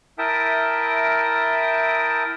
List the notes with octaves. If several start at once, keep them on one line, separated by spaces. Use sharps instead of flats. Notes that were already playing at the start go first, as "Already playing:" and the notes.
E4 A#4 E5 G5 A5 D#6